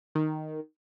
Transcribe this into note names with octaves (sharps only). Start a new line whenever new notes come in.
D#3